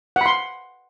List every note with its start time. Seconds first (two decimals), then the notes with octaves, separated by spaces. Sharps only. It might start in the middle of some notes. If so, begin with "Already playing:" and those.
0.16 F#5
0.21 B5
0.26 C6